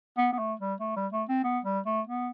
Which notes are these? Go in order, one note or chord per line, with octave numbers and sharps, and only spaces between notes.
B3
B3
A3
G3
A3
G3
A3
C4
B3
G3
A3
B3